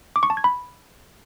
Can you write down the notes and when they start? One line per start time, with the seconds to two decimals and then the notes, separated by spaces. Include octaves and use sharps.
0.16 D6
0.23 C#6
0.30 A5
0.37 G#6
0.44 B5